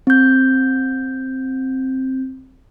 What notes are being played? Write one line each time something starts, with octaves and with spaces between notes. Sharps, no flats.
C4 G6